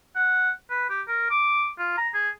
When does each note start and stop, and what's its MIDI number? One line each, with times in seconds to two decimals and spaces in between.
0.16 0.50 78
0.70 0.88 71
0.90 1.01 67
1.08 1.30 70
1.30 1.69 86
1.79 1.93 65
1.98 2.09 82
2.14 2.30 68